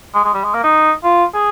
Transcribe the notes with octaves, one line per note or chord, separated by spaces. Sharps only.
G#3
G#3
G3
G#3
A#3
D#4
F4
G#4